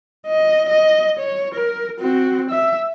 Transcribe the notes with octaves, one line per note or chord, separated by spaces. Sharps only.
D#5
D#5
C#5
A#4
C4 F#4
E5